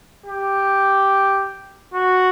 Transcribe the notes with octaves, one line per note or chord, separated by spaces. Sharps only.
G4
F#4